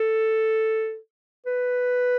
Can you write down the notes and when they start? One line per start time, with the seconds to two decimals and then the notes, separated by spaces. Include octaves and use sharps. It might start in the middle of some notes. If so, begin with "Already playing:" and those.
Already playing: A4
1.46 B4